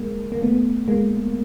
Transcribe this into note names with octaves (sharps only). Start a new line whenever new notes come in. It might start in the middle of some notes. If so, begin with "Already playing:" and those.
Already playing: G#3 A#3
A#3
A3 B3
G#3 A#3